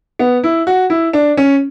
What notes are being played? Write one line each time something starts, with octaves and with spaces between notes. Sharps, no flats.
B3
E4
F#4
E4
D4
C#4